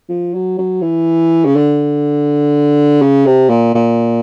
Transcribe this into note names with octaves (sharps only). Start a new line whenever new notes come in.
F3
F#3
F#3
E3
C#3
D3
C#3
C3
A#2
A#2